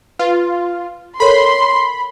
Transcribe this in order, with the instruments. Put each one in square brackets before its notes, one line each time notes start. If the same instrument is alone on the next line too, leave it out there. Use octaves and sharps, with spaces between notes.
[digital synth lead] F4 [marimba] B4
[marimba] A4 A#4 C#5 [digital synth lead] B5 [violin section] C6